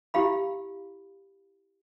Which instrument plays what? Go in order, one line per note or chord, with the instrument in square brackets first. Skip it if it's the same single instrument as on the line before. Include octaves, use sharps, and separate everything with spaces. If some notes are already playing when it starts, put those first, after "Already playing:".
[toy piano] E4 G4 F5 B5